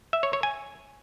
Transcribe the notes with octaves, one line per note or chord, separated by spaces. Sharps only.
E5
C#5
C#5
G#5